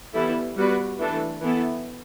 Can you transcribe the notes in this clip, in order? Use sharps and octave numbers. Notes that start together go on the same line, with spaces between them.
E3 G3 B3 E4 A4
G3 B3 F#4 B4 D5
E3 A3 D4 A4
E3 B3 E4 A4